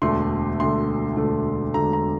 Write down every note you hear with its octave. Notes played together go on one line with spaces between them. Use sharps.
E1 D2 D3 A3 C6
E1 D2 D3 A3 C6
E1 D2 D3 A3
E1 D2 D3 A3 A#5
A#5